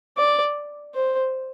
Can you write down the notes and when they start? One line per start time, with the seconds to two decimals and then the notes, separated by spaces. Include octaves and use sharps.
0.17 D5
0.94 C5